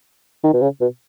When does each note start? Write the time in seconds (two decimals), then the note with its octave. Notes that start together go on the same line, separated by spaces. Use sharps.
0.44 D#3
0.54 B2
0.62 C#3
0.81 B2